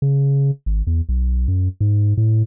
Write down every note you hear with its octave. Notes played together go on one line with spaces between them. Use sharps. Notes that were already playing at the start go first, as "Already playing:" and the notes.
C#3
G#1
E2
B1
F#2
G#2
A2